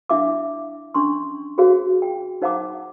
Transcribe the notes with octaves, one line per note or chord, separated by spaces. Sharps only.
D4 E4 E5 F5 D6
C#4 D4 C6 C#6
F#4 G#4 C5 F5
G5
D#4 C5 F5 F#5 A#5 D6